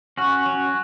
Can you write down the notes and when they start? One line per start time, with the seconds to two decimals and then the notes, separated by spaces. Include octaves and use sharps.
0.18 C#4 F#4
0.46 F#3 C#4